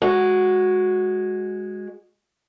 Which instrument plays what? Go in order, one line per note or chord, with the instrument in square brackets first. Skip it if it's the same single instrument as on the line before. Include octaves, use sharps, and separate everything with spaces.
[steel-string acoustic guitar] G#3 F#4